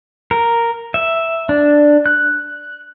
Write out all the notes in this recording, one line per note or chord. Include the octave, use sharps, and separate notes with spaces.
A#4
E5
D4
F#6